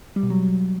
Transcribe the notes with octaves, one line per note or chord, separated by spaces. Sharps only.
G3
B2
F#3